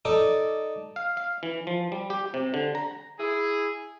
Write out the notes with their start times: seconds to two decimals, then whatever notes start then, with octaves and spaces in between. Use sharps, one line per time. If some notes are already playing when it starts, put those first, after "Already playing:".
0.05 D#4 A4 D5
0.96 F5
1.17 F5
1.43 E3
1.67 F3
1.92 G3
2.10 G4
2.34 C3
2.54 D3
2.75 A#5
3.19 E4 G#4